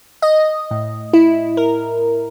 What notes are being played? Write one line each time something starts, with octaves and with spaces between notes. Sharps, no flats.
D#5
A2
E4
A#4